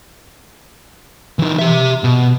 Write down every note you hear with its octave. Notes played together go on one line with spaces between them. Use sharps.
E3 D#4
G4 E5
B2